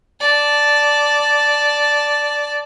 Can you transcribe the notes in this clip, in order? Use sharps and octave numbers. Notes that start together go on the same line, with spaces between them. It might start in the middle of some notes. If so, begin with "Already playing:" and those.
D5 A5